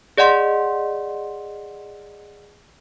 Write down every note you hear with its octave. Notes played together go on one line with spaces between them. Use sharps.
G#4 D5 D#5 F#5 C6